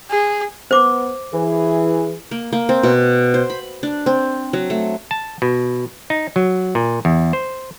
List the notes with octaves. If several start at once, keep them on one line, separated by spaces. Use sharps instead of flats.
G#4
B3 C5 D6
E3 G#4
A#3
A#3
C4
B2
C5
B5
D4
C4
F#3
A3
A5
B2
D#4
F#3
A#2
E2
C5